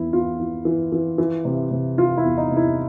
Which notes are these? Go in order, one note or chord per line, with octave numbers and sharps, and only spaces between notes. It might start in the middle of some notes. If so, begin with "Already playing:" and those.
Already playing: E2 E3 E4
E2 F4
E3
E3
E3
E3
C3
C3
E3 F4
E4
E2
D#4
C3
E4